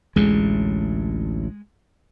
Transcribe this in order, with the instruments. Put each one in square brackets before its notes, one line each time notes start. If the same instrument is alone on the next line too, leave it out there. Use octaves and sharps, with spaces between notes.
[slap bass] A1 D2 A2 [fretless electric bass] G#3